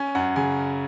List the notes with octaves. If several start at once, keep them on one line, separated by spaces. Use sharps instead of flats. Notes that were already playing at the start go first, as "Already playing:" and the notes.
Already playing: C#4 G#5
F#2 F#5
C#3 G#5